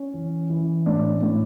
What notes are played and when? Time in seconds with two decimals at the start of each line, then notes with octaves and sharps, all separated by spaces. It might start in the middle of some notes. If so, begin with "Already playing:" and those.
Already playing: C#4
0.14 E3
0.50 E3
0.86 A2 D4
1.22 A2